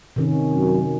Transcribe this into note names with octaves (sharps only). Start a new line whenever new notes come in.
C3 D#3 C#4
F#2